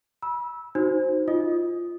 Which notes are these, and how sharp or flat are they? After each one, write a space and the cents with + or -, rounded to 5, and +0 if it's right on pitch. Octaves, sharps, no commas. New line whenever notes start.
B5 -35 E6 -10
D#4 +0 F#4 +0 C5 +0
F4 -10 D#5 +10 D#6 +0